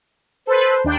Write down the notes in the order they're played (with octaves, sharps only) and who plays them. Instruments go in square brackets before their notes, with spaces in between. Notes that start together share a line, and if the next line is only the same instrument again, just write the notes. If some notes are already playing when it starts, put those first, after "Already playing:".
[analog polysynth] A4 B4 [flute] C5
[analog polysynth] D#2 D4 G5